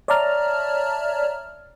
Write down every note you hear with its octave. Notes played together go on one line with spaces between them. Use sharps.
C#5 D5 E5 A5 A#5 F6